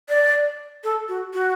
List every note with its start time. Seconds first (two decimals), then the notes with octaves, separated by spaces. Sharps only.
0.09 D5
0.84 A4
1.09 F#4
1.34 F#4